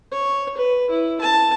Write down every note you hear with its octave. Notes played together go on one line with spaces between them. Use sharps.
C#5
B4
E4
A5